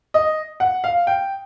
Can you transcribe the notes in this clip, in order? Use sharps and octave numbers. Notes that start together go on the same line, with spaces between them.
D#5
F#5
F5
G5